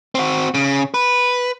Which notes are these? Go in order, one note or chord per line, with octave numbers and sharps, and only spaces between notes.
C4 F#4
C#3
B4